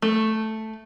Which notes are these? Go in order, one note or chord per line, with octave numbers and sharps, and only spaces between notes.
A3